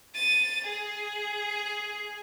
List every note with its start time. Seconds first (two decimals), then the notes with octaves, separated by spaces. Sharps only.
0.15 A6 D#7
0.64 G#4